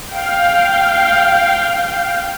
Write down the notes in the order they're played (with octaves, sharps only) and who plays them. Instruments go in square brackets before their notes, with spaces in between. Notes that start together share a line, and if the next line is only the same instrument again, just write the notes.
[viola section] F5 G5